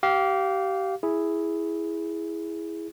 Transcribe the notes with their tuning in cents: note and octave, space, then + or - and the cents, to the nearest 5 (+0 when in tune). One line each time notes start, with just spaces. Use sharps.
G4 -25 F5 +0
E4 +0 G#4 +0